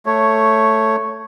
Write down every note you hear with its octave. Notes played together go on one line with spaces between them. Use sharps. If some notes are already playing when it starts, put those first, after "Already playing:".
A3 C#5